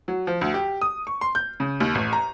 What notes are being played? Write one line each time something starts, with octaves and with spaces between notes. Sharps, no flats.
F#3
F3
D2
G4
D#6
C#6
C6
G6
C#3
D#2
A1
A#5